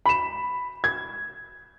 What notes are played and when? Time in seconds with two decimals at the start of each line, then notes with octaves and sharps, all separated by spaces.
0.06 B5 E7
0.84 G#6